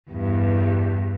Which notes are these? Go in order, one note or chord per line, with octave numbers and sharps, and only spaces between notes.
E2 G2